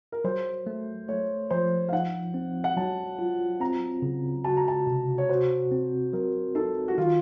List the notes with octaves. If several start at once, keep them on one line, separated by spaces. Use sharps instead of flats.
A#4
F#3 C5
A3
A3 C#5
F3 C5
F5
D#4 F#5
C4
F#5
F#3 A5
F4
C4 A#5
C#3
F#4 A5
A#5
A5
C3
C#5
F#4 C5
C4
F#3 A#4
D#4 A4
F#4
D#3 F4